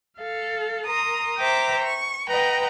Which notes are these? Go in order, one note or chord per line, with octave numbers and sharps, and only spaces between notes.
A4 F5
A#4 A#5 C6 D#6
C5 E5 G5 A#5 D6
C#6
B4 D#5 F#5 G5 A#5